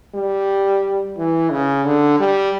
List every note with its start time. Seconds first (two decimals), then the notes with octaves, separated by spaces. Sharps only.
0.14 G3
1.17 E3
1.51 C#3
1.85 D3
2.19 G3